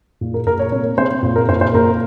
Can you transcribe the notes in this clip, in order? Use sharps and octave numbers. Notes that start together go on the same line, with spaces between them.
A#2
A#4
A#2 A#4
C#5
C3 C#5
C3 C5
A#2
A#4
A#2 C5
C5
A#2 A#4